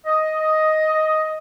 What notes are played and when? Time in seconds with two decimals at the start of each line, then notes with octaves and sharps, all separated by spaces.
0.06 D#5